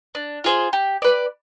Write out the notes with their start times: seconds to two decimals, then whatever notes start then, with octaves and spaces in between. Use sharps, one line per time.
0.15 D4
0.44 F4 G#4 C5
0.73 G4
1.02 B4 D5